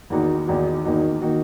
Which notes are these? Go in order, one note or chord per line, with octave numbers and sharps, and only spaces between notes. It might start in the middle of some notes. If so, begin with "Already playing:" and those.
E2 D#3 A#3 D#4 F#4
E2 D#3 A#3 D#4 F#4
E2 D#3 A#3 D#4 F#4
D#3 A#3 D#4 F#4